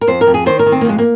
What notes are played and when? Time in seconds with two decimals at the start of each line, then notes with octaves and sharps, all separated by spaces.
0.01 A#4
0.07 F2 C5
0.21 A#4
0.27 F2
0.34 G#4
0.46 D#3 C5
0.59 A#4
0.66 D#3
0.72 C4
0.81 A#3
0.85 F2 G#3
0.98 A#3